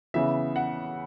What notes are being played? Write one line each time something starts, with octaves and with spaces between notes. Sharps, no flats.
C#3 E3 B3 E5
F#5